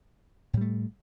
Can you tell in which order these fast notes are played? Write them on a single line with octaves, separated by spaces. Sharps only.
A2 G3 A3